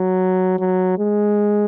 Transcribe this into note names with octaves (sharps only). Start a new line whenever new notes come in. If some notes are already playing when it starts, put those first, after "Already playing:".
Already playing: F#3
F#3
G#3